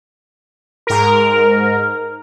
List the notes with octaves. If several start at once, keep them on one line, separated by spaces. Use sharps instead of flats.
G#2 A#4